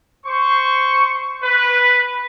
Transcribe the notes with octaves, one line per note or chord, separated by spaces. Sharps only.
C5 C#6
B4